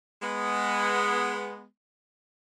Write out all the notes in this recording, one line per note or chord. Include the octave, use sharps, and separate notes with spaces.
G#3 B3